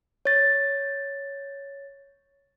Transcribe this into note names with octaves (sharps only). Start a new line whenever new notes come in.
C#5 A6